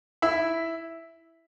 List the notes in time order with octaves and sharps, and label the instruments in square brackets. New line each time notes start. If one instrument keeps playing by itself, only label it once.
[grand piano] E4 E5